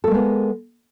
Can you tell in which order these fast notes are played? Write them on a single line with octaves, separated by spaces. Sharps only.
A4 A#3 G#3 B3